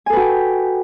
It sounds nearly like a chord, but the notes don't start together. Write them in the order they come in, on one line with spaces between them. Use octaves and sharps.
G#5 A4 B4 F#4 G5